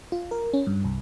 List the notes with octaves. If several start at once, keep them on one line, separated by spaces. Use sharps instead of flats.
F4
A#4
C#4
G2
C2